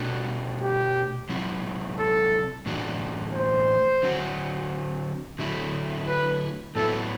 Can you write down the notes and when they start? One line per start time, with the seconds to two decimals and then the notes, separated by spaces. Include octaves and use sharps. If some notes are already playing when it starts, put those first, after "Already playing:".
Already playing: B2 A3 D4 F#4
0.61 G4
1.29 C3 F#3 C4 E4
1.99 A4
2.66 A2 E3 A3 D4 F#4
3.34 C5
4.03 D3 F#3 C4 F#4
5.39 D3 F#3 A3 E4
6.08 B4
6.76 A2 F#3 B3 E4 A4